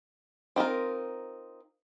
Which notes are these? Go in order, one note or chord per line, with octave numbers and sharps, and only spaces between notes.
C4 D#4 F4 A#4